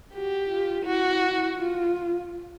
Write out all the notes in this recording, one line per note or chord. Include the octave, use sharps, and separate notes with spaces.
F#4 G4
F4
E4 F#4
F4